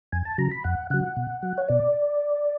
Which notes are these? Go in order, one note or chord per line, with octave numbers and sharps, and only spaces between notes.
F2 G#5
A5
C#3 F#3 A#5
B5
F2 F#5
C#3 F#3 F#5
B2
F#3
C#5
B2 D5